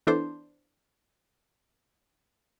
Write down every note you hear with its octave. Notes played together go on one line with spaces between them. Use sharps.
E3 B3 D4 E4 A4 C5